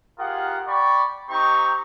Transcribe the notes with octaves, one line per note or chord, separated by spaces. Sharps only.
F4 G4 G#4 A#4 F#5
D5 G5 B5 C#6
C4 D#4 G4 A#5 C#6